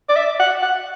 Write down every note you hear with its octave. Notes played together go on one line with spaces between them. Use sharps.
D5
E5
F#5
F#5